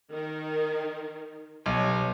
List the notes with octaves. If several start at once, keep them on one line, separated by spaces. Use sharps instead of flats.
D#3 A#4
B1 G4 B4 C#5